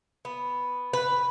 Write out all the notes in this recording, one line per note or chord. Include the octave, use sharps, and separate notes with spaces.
B3
B4